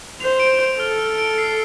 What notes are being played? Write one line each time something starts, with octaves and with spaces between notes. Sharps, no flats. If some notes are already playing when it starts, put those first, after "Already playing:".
C5 F7
D7
D7
A4 F6
F6
D7
C7